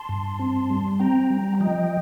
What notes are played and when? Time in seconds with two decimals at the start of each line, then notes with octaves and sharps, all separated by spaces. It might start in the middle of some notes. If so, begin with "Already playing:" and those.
Already playing: A5 C6
0.09 G2
0.39 C4
0.70 G3
1.00 C4 G5 A#5
1.30 G3
1.60 F3 D#5 G5